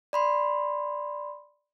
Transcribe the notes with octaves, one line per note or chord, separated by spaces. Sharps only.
D5 B5 C6